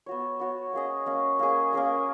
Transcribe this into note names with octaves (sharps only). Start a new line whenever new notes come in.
B3 F#4 C#5
B3 F#4 C#5
A#3 C#4 G#4 D#5
A#3 C#4 G#4 D#5
A#3 C#4 G#4 D#5
A#3 C#4 G#4 D#5